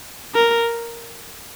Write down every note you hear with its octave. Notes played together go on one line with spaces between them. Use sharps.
A#4